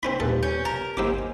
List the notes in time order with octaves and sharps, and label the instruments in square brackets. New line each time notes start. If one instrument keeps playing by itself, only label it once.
[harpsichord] C4 C#4 B5 [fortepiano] D#4 C5 G5
[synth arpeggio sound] D#2 A#2 [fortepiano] G3 B4 [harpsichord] A4
[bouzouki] C#4 [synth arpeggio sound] G6
[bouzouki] A#4 [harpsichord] A5
[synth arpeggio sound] G#1 E6 [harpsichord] D#2 G4 D6 [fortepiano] A#3 C5 G#5